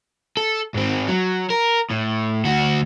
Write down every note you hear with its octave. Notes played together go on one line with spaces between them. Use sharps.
A4
G#2 C4
F#3
A#4
A2
D2 F#4